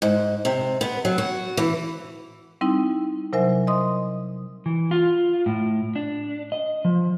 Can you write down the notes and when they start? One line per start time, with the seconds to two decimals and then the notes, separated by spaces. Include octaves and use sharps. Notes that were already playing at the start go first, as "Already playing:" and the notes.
0.02 G#2
0.45 C3
0.81 B3
1.05 F#3
1.18 F#4
1.57 E3
2.61 G3 C4 D#4 E4
3.33 C3 F#3 A#4 C5 E5 G#5
3.67 D#5 C6 D#6
4.66 E3
4.91 F4
5.46 A2
5.96 D4
6.52 D#5
6.85 F3